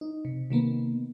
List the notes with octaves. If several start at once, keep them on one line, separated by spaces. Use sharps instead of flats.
D#4
C3
C3 D#3 A#3 B3